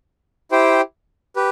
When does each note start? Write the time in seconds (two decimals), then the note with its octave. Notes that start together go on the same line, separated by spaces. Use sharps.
0.51 E4 G4 C5 G5
1.36 G4 B4